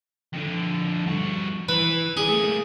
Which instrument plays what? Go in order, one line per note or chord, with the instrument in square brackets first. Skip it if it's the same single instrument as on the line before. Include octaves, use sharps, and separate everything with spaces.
[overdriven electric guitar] F2 D3
G2 F#4
[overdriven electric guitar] E3 [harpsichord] B4
[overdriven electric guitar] C#4 D5 [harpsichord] G#4
[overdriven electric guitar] A3 A#3